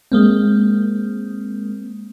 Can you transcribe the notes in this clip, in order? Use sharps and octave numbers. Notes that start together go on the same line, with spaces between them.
G#3 A#3 C4